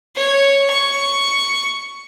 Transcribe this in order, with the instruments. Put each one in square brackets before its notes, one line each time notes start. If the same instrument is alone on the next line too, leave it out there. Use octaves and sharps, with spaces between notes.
[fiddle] C#5
C#6